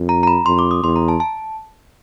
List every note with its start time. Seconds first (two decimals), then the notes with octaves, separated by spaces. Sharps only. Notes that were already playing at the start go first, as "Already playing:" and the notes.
Already playing: F2
0.09 A#5
0.23 A#5
0.27 B5
0.46 F2 C6
0.59 D6
0.71 D#6
0.83 E2 C6
0.96 A#5
1.08 A5
1.20 A5